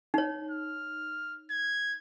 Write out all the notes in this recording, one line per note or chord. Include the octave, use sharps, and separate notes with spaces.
D#4 C#5
F6
G#6